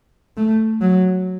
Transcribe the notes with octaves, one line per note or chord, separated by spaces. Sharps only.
A3
F#3